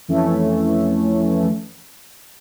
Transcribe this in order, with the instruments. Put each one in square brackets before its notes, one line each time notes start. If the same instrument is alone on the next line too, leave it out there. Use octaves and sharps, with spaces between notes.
[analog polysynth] F2 E3 A3 C#4